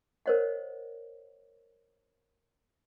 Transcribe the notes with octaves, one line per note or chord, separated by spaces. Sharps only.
A#4 C5 C#5 D#5 F#5